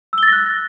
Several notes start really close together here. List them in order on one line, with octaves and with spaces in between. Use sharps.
E6 G7 A6 A#6 F#6